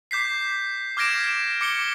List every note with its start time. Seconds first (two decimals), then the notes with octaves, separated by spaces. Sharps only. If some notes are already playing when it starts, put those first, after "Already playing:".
0.11 D6 G6 B6 C7
0.97 D6 F6 G#6 A#6 D7 E7
1.61 D6 C#7 G7